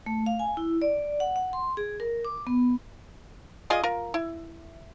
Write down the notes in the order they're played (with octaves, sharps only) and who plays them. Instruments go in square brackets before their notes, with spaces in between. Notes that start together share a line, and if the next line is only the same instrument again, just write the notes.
[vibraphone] A3
F5
G#5
E4
D5
F#5
F#5
C6
G#4
A#4
D6
B3
[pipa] F4 G#4 D5 D#5
F4 A#4
E4